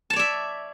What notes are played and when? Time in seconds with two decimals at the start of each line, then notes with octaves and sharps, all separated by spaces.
0.10 A5
0.13 C#5
0.16 D5
0.19 E5